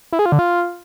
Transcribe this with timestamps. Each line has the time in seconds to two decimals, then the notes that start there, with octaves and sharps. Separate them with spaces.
0.12 E4
0.19 G#4
0.26 F4
0.32 D3
0.39 F4